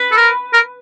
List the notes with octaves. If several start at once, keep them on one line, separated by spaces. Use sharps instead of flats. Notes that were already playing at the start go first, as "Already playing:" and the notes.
Already playing: B4
A4
A#4
A#4